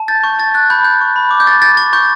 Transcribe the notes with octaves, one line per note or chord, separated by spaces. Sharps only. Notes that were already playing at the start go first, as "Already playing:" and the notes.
Already playing: A5
G6 A6
C#6 G6
G6 A6
F#6 A6
B5 G6
G6
C#6
B5
D6
G6
C#6 A6
G6 A6
C#6 A6
C#6 G6